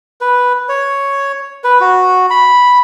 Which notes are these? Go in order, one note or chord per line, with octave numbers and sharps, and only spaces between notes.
B4
C#5
B4
F#4
B5